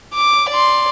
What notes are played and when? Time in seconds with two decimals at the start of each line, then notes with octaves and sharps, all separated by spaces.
0.14 D6
0.50 D5 C6